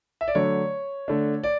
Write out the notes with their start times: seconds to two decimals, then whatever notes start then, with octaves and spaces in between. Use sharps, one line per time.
0.21 E5
0.28 D5
0.35 D3 F#3 A3 D4 C#5
1.08 D3 A3 D4
1.44 D5